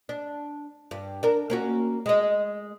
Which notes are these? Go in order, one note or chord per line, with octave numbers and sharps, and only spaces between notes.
D4
G2
D4 A#4
A#3 C#4 F#4
G#3 D#5